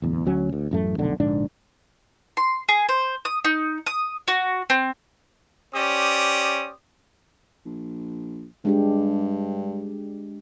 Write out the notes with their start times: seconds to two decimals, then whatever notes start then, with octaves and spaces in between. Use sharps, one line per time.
0.02 D1 E2
0.26 D2 F#3 C#4
0.53 D2
0.71 A1 F#2 A3
0.98 F1 B1 D3
1.20 A#1 G#2 D3 D4
2.37 C6
2.69 G#4
2.89 C5
3.25 D#6
3.45 D#4
3.86 D#6
4.28 F#4
4.70 C4
5.75 C#4 G4 C5 D5 D#6
7.66 A#1
8.65 G2 G#3 D4 G4